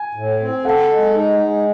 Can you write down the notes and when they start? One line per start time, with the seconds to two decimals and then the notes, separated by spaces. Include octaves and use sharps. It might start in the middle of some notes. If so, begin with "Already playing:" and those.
Already playing: G#5
0.14 A2
0.40 C4
0.65 A4 F#5
0.90 G#3
1.14 D#4
1.40 G#3